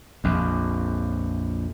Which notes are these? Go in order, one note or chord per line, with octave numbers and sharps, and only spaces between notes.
A#1 F2